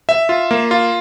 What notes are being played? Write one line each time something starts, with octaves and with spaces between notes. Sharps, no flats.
E5
F4
A#3
F4